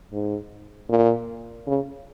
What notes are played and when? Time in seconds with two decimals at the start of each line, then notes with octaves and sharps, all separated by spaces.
0.12 G#2
0.89 A#2
1.67 C#3